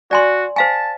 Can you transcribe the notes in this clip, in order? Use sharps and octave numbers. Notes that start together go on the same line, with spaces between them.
F#4 D5 G#5 C6
C5 F5 G#5 A5